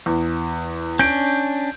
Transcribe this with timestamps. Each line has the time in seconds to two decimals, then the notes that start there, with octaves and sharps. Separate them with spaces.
0.06 E2
0.99 C#4 D4 G6 D7